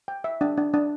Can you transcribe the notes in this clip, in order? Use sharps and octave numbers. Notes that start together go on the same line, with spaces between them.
G5
E5
D4
D4
D4